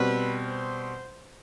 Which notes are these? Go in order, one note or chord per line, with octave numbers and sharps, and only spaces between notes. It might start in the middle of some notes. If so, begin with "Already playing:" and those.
Already playing: B2 G3 C4 B4
C5